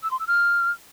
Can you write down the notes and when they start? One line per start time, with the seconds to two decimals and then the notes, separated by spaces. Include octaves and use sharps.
0.03 E6
0.11 C6
0.19 E6
0.27 F6